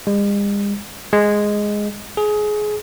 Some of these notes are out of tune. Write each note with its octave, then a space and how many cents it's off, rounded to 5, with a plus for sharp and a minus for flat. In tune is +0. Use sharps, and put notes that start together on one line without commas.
G#3 -45
G#3 +0
G#4 +20